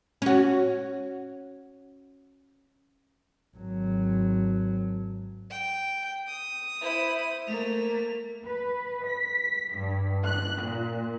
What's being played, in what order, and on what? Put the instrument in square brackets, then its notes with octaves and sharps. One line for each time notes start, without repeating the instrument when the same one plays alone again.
[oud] C#4 F#4
[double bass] G#1 F#3
[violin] G5
D#6
[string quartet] E4 C5
[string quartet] A3 A#3 [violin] F7
[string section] B4
B6
G2
F#6
A#2